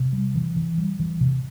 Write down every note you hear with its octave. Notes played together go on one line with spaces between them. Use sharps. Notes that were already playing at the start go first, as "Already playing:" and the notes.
Already playing: C3
G3
E3
E3
G3
E3
C3